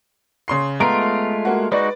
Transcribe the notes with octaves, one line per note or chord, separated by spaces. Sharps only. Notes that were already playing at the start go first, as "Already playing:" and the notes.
C#3 C6 C7
G#3 A3 B3 F4 A#5 D7
A#3 F#4
G#3 D#4 F#4 B4 D5